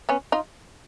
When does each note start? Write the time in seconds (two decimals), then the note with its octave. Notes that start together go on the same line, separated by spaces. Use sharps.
0.09 B3 C#4
0.32 D#4 F4